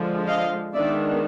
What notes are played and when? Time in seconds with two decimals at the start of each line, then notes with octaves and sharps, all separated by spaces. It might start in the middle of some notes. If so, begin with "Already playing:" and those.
Already playing: D3 F3 G#3
0.27 D#5 F5
0.74 D#3 G#3 B3 D4 D5 E5